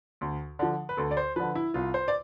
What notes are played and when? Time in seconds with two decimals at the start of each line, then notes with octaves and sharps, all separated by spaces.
0.21 D2
0.59 D3 F3
0.89 B4
0.97 D2 A4
1.11 D5
1.17 C5
1.36 D3 F3 B4
1.55 E4
1.74 C2 F4
1.94 C5
2.08 D5